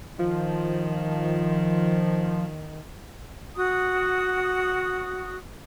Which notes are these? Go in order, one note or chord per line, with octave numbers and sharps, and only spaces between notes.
D#3 F3
F#4 D#6